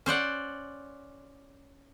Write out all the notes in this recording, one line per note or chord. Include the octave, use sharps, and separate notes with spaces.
C#4 C5 D5 F#5